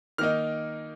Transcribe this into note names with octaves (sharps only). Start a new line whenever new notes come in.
D#3 A#3 D#4 F6